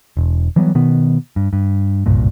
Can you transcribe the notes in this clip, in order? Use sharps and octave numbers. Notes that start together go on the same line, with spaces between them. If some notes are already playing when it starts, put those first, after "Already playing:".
E1
E3 F#3 G3 B3
B2 D#3 B3
G2
G2
F#1 C2 G2 A#2